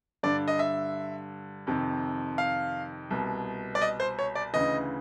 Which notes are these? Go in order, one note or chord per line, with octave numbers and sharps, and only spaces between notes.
G2 D3 D5
D#5
E5
F2 C3 D#3
F5
C2 B2
D5
D#5
C5
C#5
D5
D2 C#3 E3 D#5